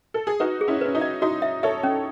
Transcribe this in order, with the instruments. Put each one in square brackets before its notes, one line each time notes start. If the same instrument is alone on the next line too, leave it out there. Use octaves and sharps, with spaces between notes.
[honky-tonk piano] A4
G#4
[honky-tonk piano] D#4 F#4 [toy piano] B4
[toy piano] G#4
[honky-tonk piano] C#4 E4
[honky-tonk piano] C#4 [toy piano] B4
[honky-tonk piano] D#4
[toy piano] D#5
[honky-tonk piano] D#4 [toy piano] F#4
[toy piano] E5
[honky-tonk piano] A4 C#5 [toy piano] E5
[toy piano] C#4